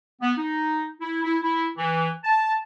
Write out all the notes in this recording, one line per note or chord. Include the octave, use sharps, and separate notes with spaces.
B3
D#4
E4
E4
E4
E3
A5